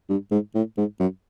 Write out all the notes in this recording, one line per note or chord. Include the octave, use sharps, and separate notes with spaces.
G2
G#2
A2
G#2
F#2